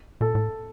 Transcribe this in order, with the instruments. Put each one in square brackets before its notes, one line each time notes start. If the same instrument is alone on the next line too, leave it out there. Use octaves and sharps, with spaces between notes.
[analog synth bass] A#2 [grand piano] A4
[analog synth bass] A2